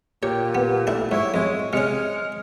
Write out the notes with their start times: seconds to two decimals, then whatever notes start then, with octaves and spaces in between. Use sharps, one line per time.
0.23 A#2 G4 C#5
0.55 B3
0.87 A3 D4 E4
1.11 G#2 E4 C#5
1.34 F2 G#3
1.73 C3 G#3 C#4 F6 C#7